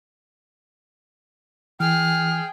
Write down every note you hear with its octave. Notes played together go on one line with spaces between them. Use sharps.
E3 G#4 G5 F6